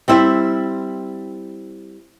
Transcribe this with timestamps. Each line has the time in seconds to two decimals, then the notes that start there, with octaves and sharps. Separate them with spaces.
0.08 G3 C4 E4